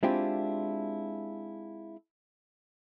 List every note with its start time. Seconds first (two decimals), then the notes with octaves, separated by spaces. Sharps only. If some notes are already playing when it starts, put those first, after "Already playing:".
0.03 G#3 C4 D4 E4 F4 G4